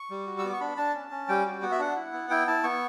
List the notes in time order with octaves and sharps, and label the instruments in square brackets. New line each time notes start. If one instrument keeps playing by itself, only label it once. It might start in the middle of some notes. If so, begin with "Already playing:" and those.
Already playing: [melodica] C#6
G3
F#4
E6
B3 D6
C#6
D4 B5
D4 A5
C#4
C#4
G3 G5
F#4
B3 F#5
E5
D4 F#5
E4
B3
E4 G5
E4 A5
B3 C#6